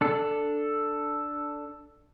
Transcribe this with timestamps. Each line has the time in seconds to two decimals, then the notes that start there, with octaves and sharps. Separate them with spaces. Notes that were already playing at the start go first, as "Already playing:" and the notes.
0.01 D4 A4